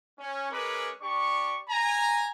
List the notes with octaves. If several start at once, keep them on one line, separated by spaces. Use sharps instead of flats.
C#4
G#3 C#4 A#4 B4 B5 D6
D4 G4 D5 C#6
G#5 A#5